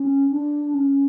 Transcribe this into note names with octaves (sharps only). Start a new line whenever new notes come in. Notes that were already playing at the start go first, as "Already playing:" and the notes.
Already playing: C#4
D4
C#4